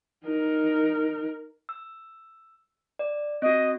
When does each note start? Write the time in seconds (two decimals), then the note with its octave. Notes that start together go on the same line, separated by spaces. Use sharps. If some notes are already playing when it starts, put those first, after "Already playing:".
0.24 D#4 A#4
1.69 E6
2.99 D5
3.42 C4 F#4 D#5